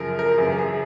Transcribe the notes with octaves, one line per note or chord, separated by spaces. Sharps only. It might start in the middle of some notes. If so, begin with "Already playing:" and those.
Already playing: F#2 C#3 F3 A#4
A#4
F#2 C#3 E3
G#4